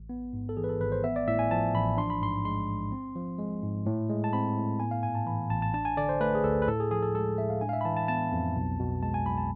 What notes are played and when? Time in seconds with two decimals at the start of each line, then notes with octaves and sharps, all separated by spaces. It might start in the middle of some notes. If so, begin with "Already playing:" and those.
Already playing: A1
0.09 B3
0.33 G#2
0.49 A4
0.57 E3 G#4
0.64 B4
0.69 A4
0.80 G#1 B4
0.92 C5
1.04 B3 E5
1.16 D5
1.28 A2 E5
1.39 G#5
1.51 F3 A5
1.74 A1 B5
1.98 D4 C6
2.10 B5
2.21 G#2 C6
2.45 G#3 C6
2.69 A1
2.92 C4
3.16 F3
3.39 G#3
3.62 G#2
3.86 A2
4.09 G#3
4.24 A5
4.33 C4 B5
4.57 A2
4.80 B3 G#5
4.91 F5
5.03 G#2 G#5
5.15 A5
5.26 E3 B5
5.50 A1 A5
5.62 A5
5.74 D4 A5
5.85 G#5
5.97 D3 D5
6.09 C5
6.20 A3 B4
6.35 G#4
6.44 D2 A4
6.62 B4
6.67 A2 A4
6.80 G#4
6.91 F3 G#4
7.02 A4
7.15 G#3 A4
7.38 A2 E5
7.50 F5
7.61 D4 G#5
7.69 F5
7.73 E5
7.81 B5
7.85 E3 A5
7.97 A5
8.08 B3 A5
8.32 F2
8.56 B1
8.80 B2
9.02 G#3 A5
9.14 G#5
9.26 B1 B5
9.38 A5